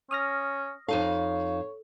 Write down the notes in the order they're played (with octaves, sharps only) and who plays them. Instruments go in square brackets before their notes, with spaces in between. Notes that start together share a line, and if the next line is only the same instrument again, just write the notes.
[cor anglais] C#4 [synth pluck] D#6 F6 A#6
[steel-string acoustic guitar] F2 D#4 F5 [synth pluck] A4 [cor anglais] C#5